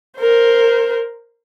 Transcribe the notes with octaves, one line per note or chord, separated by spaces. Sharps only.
A#4 C5